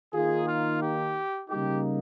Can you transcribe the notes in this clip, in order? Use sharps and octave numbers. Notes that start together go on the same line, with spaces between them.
D#3 A#3 D#4 F4 G#4
F4
G4
C#3 G3 A#3 D#4 G4